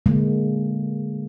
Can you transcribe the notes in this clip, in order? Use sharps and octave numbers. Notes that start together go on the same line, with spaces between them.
D3 G#3 A#3